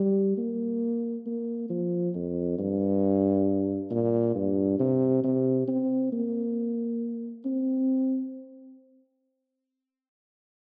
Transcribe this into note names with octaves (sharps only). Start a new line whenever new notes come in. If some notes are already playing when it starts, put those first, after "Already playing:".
Already playing: G3
A#3
A#3
F3
F2
G2
A#2
G2
C3
C3
C4
A#3
C4